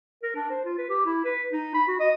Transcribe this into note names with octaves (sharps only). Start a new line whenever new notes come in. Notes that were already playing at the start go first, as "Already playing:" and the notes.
A#4
D4
C5
F4
B4
G4
E4
B4
D#4
B5
F#4
D#5